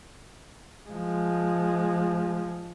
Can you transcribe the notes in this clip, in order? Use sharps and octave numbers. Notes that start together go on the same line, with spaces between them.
F3 G#3